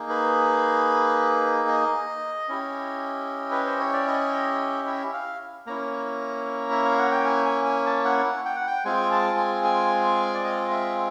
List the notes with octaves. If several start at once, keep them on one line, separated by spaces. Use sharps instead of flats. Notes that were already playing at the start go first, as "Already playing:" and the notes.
Already playing: A#3 D#4 G#4
B4
D#5
C#4 E4 G4
B4
C5
C#5
D5
D#5
E5
F5
A#3 C#4 E4 A#5
E5
F5
F#5
G5
G#5
G#5
G#5
A5
F#5
G5
F#5
G5
G#3 C4 F4 G#4 G#5
A5
G#5
G#5
D5
D#5
E5